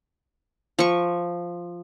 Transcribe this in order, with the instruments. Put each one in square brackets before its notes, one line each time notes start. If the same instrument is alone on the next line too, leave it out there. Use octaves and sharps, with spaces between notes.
[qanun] F3 C#6